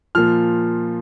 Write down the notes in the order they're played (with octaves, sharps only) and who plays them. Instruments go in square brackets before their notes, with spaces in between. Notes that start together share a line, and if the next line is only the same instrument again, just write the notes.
[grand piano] A#2 F3 F6